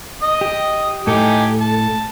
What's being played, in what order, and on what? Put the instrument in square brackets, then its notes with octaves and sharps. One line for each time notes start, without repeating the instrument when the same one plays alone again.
[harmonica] D#5 D#6
[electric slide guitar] G4
[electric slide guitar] A2 A4 [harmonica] D#4 G4 G#5
[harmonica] A5